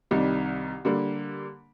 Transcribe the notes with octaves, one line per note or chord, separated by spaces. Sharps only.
C2 C3 D#3 G3
D3 G3 A#3